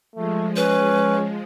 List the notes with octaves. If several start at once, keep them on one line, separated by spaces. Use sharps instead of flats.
F3 G#3 A3
C#4 B4